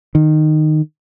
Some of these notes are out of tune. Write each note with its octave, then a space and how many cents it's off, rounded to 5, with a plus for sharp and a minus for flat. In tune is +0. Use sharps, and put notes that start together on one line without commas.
D#3 -15